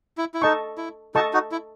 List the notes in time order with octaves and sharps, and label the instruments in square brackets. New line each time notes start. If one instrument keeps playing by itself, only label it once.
[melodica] E4
E4
[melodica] D#4 [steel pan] A4 D#5 A5 C#6
[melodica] E4
[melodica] D#4 F#4 [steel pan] A4 D#5 A5 C#6
[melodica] D#4 F#4
E4